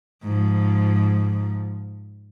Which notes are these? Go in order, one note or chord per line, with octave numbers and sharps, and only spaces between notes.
G#2 F3